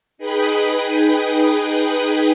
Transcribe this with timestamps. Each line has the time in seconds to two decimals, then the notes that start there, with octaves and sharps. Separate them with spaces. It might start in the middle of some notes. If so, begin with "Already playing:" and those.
0.18 D#4 G#4 B4 G5 B5 D#6